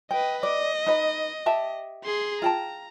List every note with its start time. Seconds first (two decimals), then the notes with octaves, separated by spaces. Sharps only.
0.11 B4 D#5 G5
0.43 D5 D#5
0.87 D#4 B4
1.46 G4 E5 A5
2.04 G#4 C6
2.42 F4 G5 A5 A#5